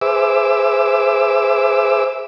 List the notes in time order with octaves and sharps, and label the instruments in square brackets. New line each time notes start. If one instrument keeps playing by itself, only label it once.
[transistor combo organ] G#4 B4 C5 E5 D6 E6